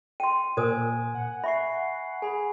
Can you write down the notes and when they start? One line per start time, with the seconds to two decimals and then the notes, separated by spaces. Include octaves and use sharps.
0.20 G5 C6 D#7
0.57 A#2 A#4 C5 G#5 D#6 G#6
1.15 F#5
1.44 E5 B5 C#6 C7
2.22 G#4 G#5 B5